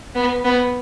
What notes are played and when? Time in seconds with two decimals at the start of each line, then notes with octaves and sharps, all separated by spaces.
0.15 B3
0.45 B3